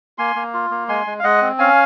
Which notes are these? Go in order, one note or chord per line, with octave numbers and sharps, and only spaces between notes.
A#3 G#5 C6
A#3
F4
A#3
G#3 G#5 C6
G#3
F5
G#3 D#5 F#5
C4
C#4 F5 G#5